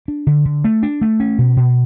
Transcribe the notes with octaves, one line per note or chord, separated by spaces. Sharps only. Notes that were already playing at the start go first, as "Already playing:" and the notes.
D4
D3
D3
A3
D4
A3
C#4
B2
B2